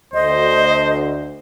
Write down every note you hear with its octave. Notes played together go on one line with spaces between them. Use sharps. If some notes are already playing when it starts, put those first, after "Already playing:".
D2 C5 D#5